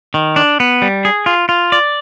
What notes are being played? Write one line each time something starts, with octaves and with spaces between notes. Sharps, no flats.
D#3
D4
B3
G3
G#4
F4
F4
D5